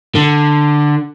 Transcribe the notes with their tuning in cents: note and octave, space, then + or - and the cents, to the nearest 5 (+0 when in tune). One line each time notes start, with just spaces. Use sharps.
D3 +10